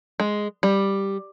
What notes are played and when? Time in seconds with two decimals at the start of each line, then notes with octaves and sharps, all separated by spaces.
0.20 G#3
0.63 G3